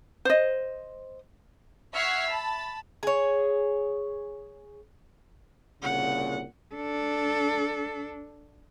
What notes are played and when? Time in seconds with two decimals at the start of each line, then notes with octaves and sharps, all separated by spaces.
0.25 C5 D#5
1.93 E5 F#5 C#6 F6 G#6 C7
2.28 A5 B5
3.03 G#4 C#5
5.82 C2 A#2 C#3 F#5
6.75 D4 A4